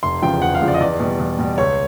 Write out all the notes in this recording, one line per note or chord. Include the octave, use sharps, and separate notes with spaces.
F1 C6
E2 C#3 F3 G5
F1 F#5
F5
E2 C#3 F3
D5
D#5
E2 D5
B2 G3
E2
B2 G3
C#2 C#5